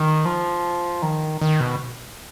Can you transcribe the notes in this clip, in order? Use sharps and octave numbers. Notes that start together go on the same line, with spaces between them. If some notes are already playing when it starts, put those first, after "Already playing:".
Already playing: D#3
F3
D#3
D#3
B2